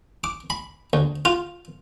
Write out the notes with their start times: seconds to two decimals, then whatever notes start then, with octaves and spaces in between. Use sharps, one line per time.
0.24 D6
0.50 B5
0.93 D2
1.25 F4